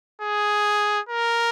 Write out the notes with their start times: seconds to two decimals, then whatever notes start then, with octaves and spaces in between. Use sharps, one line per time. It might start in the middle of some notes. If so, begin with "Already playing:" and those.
0.22 G#4
1.09 A#4